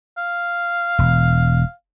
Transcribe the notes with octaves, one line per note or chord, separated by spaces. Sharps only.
F5
E1